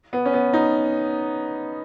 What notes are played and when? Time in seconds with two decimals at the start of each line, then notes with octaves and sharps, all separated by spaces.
0.13 B3
0.25 C#4
0.33 B3
0.53 D#4